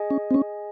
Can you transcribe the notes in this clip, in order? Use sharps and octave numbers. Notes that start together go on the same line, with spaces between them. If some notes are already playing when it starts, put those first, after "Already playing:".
Already playing: G#4 D#5 G#5
C#4
C4
C#4